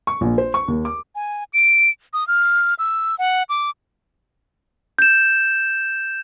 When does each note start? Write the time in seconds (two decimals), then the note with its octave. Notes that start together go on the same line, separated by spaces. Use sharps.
0.07 C#6
0.21 A#1
0.38 C5
0.54 C#6
0.68 D#2
0.85 D6
1.15 G#5
1.53 D7
2.13 D#6
2.28 F6
2.79 E6
3.19 F#5
3.49 D6
4.99 G6 E7